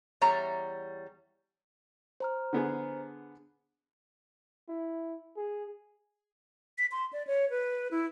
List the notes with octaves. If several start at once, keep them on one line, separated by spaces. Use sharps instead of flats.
E2 G3 C#5 A#5
C5 A#5 F6
D3 B3 G#4
E4
G#4
B6
C6
D5
C#5
B4
E4